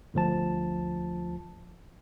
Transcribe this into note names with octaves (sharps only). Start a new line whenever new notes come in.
G1 D2 F3 A5